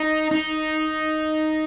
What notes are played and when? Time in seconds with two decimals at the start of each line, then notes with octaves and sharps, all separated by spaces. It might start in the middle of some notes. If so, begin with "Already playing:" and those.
Already playing: D#4
0.31 D#4